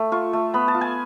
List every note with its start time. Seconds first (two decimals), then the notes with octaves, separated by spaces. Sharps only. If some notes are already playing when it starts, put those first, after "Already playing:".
Already playing: A3
0.12 F4 C#6
0.33 A3
0.54 B3 B5
0.68 A5
0.75 F4
0.81 G#5